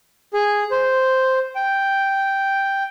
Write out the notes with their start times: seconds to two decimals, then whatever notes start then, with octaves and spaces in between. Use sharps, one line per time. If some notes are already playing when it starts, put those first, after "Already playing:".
0.33 G#4
0.71 C5
1.55 G5